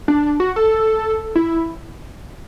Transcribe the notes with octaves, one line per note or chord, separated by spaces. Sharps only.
D4
F#4
A4
E4